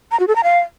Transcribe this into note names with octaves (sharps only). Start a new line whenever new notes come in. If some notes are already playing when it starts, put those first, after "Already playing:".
A#5
F#4
A4
A#5
F5